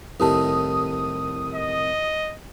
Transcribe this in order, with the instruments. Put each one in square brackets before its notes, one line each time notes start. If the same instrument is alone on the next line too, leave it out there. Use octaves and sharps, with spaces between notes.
[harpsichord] C2 A2 D#3 [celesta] E4 G4 A5 [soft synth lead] D#6
[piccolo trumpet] D#5